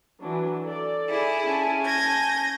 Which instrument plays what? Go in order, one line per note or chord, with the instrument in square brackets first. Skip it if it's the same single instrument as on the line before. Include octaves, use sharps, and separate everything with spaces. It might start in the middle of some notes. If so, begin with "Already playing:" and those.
[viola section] E3 F#3 D4
A4 D5
[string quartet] E4 G#4
[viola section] C#4 G#5 A5
[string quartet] G6 G#6 A#6